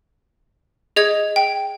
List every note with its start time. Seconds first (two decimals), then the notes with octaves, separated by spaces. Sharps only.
0.96 G#4 D#5 G#6
1.36 G5